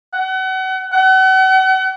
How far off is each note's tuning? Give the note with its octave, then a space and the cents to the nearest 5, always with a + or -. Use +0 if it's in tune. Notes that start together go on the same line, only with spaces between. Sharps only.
F#5 +35
F#5 +40